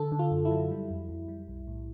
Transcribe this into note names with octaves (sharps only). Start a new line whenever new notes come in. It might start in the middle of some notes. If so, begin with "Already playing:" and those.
Already playing: D3 A4
D3
F4
F#2
E4
F#3
G3
F2
F2
G3
B1
A2